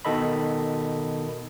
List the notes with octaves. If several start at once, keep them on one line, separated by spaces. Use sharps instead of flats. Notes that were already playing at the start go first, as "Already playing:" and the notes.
B2 D#3 A4 D#5 B5